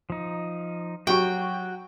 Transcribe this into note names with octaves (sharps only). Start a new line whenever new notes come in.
F3 D#4
F#3 F#4 G4 G5 C#6